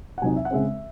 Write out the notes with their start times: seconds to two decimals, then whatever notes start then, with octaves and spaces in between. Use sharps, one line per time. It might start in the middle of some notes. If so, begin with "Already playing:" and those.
0.18 F#5
0.22 C3 F#3 C4 D#4 G#5
0.36 E5
0.45 F#5
0.51 C#3 G#3 C4 E5